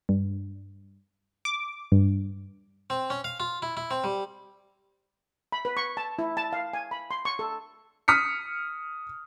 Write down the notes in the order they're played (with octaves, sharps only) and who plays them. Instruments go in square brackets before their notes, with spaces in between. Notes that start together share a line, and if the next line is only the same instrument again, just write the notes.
[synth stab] G2
D6
G2
[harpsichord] C4
C#4
F5
F4
E4
E4
C4
G3
[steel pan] B5
B4
C#6
A5
E4
A5
F5
G#5
B5
C6
C#6
A4
[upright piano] D#6 F6 B6 C#7